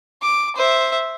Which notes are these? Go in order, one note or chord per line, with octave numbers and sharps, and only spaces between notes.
D6
C5 E5